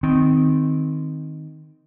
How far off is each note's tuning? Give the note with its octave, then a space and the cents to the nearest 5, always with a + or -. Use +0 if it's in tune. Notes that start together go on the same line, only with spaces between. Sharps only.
D#3 +0 C4 -15